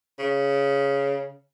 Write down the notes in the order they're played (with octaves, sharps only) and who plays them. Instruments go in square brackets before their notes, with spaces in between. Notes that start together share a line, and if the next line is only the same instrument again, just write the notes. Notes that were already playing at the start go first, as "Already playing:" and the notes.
[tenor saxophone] C#3